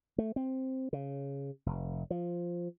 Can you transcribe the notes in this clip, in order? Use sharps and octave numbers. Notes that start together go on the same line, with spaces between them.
A3
C4
C#3
F1
F3